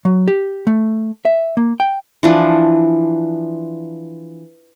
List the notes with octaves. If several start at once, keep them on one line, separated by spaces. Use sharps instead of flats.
F#3
G4
A3
E5
A#3
G5
E3 F3 D4